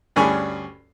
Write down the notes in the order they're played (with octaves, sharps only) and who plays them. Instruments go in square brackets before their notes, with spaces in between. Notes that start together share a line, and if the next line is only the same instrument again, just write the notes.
[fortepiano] D2 G2 C#4 D4 G#4 B5